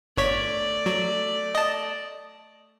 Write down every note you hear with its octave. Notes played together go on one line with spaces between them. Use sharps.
G1 A3 C#5 D5 B6
F#3
D#5 A5